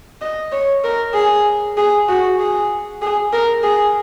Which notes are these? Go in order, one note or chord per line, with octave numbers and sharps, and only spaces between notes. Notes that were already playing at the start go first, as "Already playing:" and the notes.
D#5
C#5
A#4
G#4
G#4
F#4
G#4
G#4
A#4
G#4